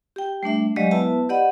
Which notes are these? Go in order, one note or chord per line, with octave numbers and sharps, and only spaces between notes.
G4 G5
G3 A3 D4 E5
F#3 G#3 G4 D5 D#5 F5
B3 E4 B4 E5 A5
G4 D5 D#5 F#5 B5